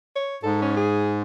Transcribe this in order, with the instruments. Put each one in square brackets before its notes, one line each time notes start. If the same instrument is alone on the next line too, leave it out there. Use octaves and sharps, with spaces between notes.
[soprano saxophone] C#5
[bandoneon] G#2 [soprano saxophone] A4
[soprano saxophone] C#4
G#4